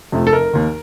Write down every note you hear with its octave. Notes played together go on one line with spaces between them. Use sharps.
F2 C3 F3 A3
A4
F1 A#4
D#2 D#3